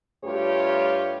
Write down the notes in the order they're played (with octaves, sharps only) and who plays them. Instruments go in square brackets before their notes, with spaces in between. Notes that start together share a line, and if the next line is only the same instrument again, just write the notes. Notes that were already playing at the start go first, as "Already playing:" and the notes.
[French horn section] G2 A3 F4 G4 B4 C#5